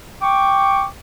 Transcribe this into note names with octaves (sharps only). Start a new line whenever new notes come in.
G5 C#6 D6